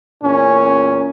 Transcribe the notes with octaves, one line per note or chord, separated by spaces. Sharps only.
E2 A#2 C#4